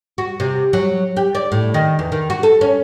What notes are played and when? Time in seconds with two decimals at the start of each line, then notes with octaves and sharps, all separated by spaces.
0.18 F#4
0.40 C3
0.73 F#3
1.17 G4
1.35 D5
1.52 A2
1.74 D#3
1.99 E2
2.12 D#3
2.30 F#4
2.43 A4
2.61 C#4